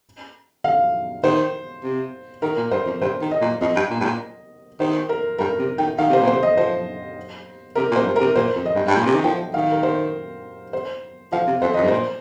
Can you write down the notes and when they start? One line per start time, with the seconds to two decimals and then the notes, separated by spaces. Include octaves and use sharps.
0.64 F5
1.23 D#3 C5
1.83 C3
2.42 D#3 A#4
2.57 A#2
2.71 G2 C5
2.86 F2
3.01 G2 C5
3.21 D#3
3.31 D#5
3.41 A#2
3.61 F2 D#5
3.75 G2
3.90 A#2
4.00 G2
4.05 A#2
4.80 D#3 C5
5.09 A#4
5.39 G2 A#4
5.59 C3
5.78 D#3 G5
5.98 D#3 F5
6.09 C3 C5
6.20 A#2
6.27 C3 C5
6.43 D#5
6.57 F3 C5
7.75 C3 A#4
7.91 A#2
7.96 F2 C5
8.06 G2
8.16 C3 A#4
8.35 A#2 C5
8.55 F2
8.66 D#5
8.75 G2
8.87 G2
8.96 A#2
9.06 C3
9.15 D#3
9.24 F3 G5
9.54 D#3 F5
9.72 A#4
9.83 C5
10.73 C5
11.32 F3 F5
11.47 C3
11.62 F2 C5
11.74 F2 D#5
11.83 G2
11.88 A#2 C5